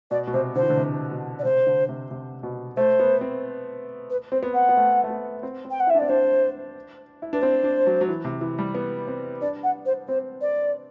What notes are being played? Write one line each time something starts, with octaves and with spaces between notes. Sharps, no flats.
B2 D5
B2
C3 C5
D3 C5
E3
D3
C3
B2
D5
C3 C5
D3
C3
C3
B2
A3 C5
B3
C4
B4
C4 C5
B3
F#5
B3
A3
A3
B3
C4
C4
G5
F#5
E4
D4 E5
C4 D5
D4 C5
E4
D4 B4
C4 C5
D4
F#3
F#3
E3
C3
E3
G3
B3
C4
D4 D5
F#5
C5
C4 C5
D5